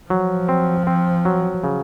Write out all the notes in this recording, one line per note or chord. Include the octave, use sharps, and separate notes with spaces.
F3 F#3
C4
C4
F#3
C#3